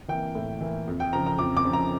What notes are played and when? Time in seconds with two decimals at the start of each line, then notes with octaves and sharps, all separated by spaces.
0.08 E3 A#3 G5
0.35 A2
0.61 E3 A#3
0.87 F2
1.00 G5
1.13 C#3 F3 A#5
1.26 A#5
1.39 F2 D6
1.57 D6
1.65 C#3 F3
1.73 A#5